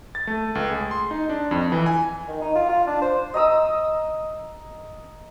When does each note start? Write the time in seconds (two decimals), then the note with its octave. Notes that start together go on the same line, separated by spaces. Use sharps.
0.15 A6
0.27 A3
0.55 C#2
0.70 G#4
0.91 C6
1.11 D#4
1.30 D4
1.51 F2
1.72 E3
1.86 G#5
2.28 D#3
2.42 D#4
2.55 F4
2.69 F4
2.87 D4
3.02 C5
3.34 D#5 A#5 D#6 E6